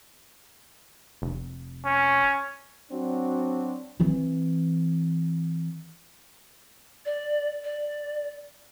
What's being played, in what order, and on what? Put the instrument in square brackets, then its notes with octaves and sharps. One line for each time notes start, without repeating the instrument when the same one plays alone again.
[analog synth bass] F1
[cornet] C#4
[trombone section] F#3 C4 D4 F#4
[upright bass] E3 C4
[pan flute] D5
D5